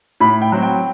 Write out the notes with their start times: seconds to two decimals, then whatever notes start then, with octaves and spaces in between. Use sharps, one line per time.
0.20 A2 B5
0.42 G5
0.52 F#3 C4
0.63 G5